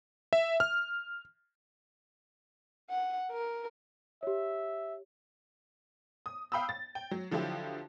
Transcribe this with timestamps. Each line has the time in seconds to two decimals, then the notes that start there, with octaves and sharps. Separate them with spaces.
0.33 E5
0.60 F6
2.90 F#5
3.31 A#4
4.23 G4 C#5 E5
6.26 D#6
6.52 F5 G5 B5 D#6 E6
6.69 A6
6.95 G5
7.11 F#3
7.31 D3 F3 F#3 E4 F4 G4